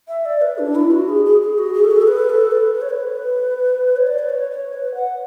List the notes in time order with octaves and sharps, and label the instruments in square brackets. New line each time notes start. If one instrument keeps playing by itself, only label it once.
[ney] E5
D5
B4
D4
E4
F#4
G#4
G#4
G#4
F#4
G#4
A4
G#4
A4
B4
A4
B4
B4
C#5
B4
C#5
D5
B4
C#5
C#5
B4
F#5